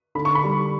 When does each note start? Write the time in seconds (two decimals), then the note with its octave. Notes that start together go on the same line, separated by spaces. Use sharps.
0.15 D3 B5
0.25 C#6
0.35 B5
0.44 G3